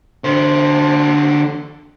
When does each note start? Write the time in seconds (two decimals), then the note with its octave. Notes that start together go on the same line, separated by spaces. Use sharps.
0.24 D3 C5